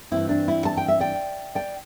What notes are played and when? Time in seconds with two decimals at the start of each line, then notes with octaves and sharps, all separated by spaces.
0.11 G2 E3 C4 E4
0.29 D4
0.48 E4
0.65 A5
0.77 G5
0.88 E5
1.00 D5 G5
1.55 D5 G5